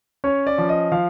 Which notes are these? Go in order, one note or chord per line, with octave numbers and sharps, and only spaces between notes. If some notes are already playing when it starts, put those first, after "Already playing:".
C#4 C#5
D5
F3
D#5
F3 F5